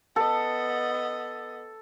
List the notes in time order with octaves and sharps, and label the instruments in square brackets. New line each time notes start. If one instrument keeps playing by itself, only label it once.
[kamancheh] B3 D#5 [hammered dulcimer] A4